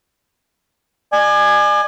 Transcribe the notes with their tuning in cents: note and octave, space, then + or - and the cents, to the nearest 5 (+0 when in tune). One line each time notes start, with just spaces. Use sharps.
D5 +40 G#5 +0